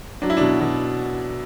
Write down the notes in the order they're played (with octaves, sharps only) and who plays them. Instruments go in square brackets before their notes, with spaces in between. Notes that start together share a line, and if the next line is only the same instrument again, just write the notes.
[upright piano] F#3 D4
E4
B2 D4
B2